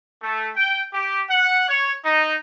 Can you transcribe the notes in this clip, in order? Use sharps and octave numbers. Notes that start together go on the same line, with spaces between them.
A3
G5
G4
F#5
C#5
D#4